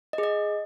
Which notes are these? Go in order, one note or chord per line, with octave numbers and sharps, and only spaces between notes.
D#5
G#4
D#5